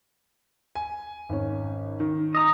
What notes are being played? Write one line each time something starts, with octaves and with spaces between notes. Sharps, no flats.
G#5
G#1 C#4
D#3
D#5 A#5